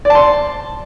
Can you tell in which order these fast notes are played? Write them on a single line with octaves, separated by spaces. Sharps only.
D5 A5 C6